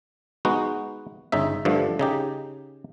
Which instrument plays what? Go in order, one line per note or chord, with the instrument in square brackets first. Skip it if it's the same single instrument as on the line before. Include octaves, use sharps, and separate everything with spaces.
[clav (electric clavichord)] G#3 B3 D#4 F#4
G1 C#3 D#4 E5
G2 D3 F3 A3
C#3 D#4 G4